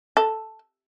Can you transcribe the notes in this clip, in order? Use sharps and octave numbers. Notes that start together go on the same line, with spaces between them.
A4